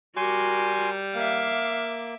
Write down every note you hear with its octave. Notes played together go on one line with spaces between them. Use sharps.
G3 F#4 A#4 G#5 C6
A#3 E5 F5 D6